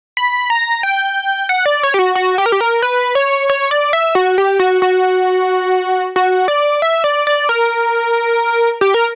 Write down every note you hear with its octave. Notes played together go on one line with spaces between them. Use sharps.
B5
A#5
G5
F#5
D5
C#5
G4
F#4
F#4
G4
A#4
G4
A#4
B4
C#5
C#5
D5
E5
F#4
G4
F#4
F#4
F#4
D5
E5
D5
D5
A#4
G4
A#4